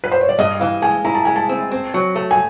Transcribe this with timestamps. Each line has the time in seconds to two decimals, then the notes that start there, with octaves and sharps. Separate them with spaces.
0.04 B4
0.12 C5
0.21 C#5
0.29 D5
0.39 G2 D#5
0.60 E3 F5
0.82 G#3 G#5
1.05 E4 A#5
1.15 A5
1.25 G#3 G#5
1.36 A5
1.49 C4
1.71 C4
1.94 F#3
2.16 A3
2.31 G#5